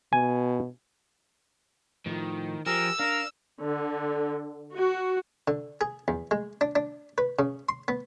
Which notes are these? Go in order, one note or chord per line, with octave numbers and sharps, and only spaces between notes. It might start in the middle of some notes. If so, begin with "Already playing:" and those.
B2 G#5
A2 D#3 F3
F3 G4 G#4 A#4 E6
D4 A#4 F5
D3
F#4
D3
G#4
E2
G#3
D4
D4
B4
C#3
C6
B3